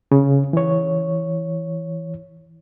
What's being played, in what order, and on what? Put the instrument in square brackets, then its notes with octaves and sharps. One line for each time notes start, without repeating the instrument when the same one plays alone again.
[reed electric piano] C#3
E3 C#5